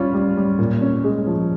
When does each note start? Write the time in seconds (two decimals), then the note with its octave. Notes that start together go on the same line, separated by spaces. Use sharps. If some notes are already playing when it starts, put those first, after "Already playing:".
Already playing: G3 C#4 F4
0.14 G3
0.37 G3
0.59 A#2
0.81 C#4
1.04 G#3
1.27 F3